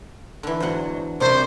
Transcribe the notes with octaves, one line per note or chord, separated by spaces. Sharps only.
D3 E3
E2 G#2 F#3 C5 F#5
F#2 C3 G3 C5